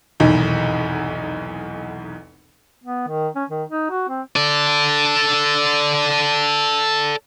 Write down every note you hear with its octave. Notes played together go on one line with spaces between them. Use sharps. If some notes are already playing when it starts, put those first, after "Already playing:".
F1 B1 E2 G#2 D#3
B3
D#3
C#4
D#3
D#4
F#4
C4
A4 D5